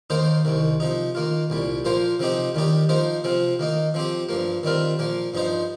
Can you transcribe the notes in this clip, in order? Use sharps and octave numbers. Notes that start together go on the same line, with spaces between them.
D#2 D#3 A#3 D#4 C5
C2 C3 D#3
C3 F3 D#4
D#3 A#3 F4
C2 A#2 G3
A#2 F3 A#3 F4 C5
C3 F3 C4 D#4 G4
D#2 D#3 G3 D#4 G4
F3 A#3 D#4 C5
C3 F3 C4 F4
D#3 A#3 D#4
F3 C4 G4
G2 F3 A#3
D#3 G3 C4 F4 A#4
A#2 F3 A#3
G2 F3 D#4 C5